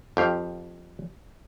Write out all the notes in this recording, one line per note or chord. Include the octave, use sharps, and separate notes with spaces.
F2 G4 F5